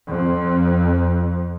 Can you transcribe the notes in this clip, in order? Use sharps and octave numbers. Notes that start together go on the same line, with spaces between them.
F2